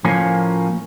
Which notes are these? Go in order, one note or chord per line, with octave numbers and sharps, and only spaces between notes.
A2 F3 A#3 C#4 C5 G#5